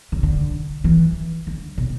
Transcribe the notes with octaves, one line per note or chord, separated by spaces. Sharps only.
C#3
D3
E3
D3
B2